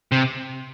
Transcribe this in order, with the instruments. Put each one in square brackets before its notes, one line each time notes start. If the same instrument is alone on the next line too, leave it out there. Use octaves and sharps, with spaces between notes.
[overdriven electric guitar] C3